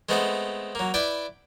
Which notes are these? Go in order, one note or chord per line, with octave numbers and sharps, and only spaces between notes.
G#3 A3 B3 C4 A4
F#3 A#3
E4 B4 D5 G5